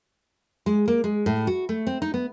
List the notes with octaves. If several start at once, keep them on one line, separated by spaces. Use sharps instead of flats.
G#3
A#3
G#3
A2
F#4
A3
C4
D#4
B3